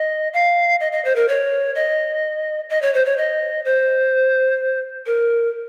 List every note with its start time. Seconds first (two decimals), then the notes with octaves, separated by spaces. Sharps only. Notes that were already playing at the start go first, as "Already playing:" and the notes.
Already playing: D#5
0.33 F5
0.80 D#5
0.92 D#5
1.05 C5
1.16 A#4
1.29 C#5
1.75 D#5
2.70 D#5
2.82 C#5
2.94 C5
3.06 C#5
3.18 D#5
3.65 C5
5.06 A#4